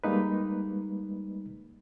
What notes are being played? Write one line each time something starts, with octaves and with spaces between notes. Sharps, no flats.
G3 G#3 A#3 D#4 B4